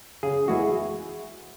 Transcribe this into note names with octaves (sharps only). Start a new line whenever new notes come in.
C#3 G#4
E3 G#3 E4 F#4 G#4